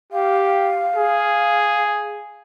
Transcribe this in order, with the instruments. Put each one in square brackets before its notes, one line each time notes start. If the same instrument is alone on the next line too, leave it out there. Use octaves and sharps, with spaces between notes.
[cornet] G4 [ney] F5
[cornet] G#4